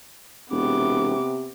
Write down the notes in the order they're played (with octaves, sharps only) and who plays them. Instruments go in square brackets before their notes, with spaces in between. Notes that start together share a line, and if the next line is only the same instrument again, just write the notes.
[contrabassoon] E1 [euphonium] C3 [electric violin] B3 D6